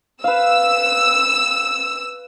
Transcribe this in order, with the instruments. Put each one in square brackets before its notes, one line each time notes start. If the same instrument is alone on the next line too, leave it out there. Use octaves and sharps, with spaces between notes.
[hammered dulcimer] B4 F5 [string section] E6